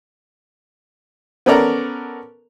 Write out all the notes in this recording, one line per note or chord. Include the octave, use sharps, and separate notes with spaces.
B3 C#4 A4 A#4 D5 A#5